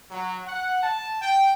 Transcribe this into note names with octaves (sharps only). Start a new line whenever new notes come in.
F#3
F#5
A5
G5